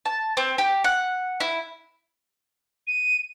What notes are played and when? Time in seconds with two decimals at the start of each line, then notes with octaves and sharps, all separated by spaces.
0.05 A5
0.37 C4
0.58 G4
0.84 F#5
1.40 E4
2.87 D#7